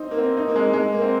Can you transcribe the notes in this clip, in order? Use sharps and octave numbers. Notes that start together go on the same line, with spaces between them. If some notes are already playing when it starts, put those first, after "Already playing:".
Already playing: C4 D#4
A#3
C4
D#4
A#3
G#3
G#3
A#3
C4